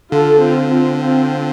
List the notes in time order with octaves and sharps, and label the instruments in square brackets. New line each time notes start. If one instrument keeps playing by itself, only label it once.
[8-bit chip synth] D3 [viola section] F4 A4
[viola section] C4 F4
C4 F4
C4 F4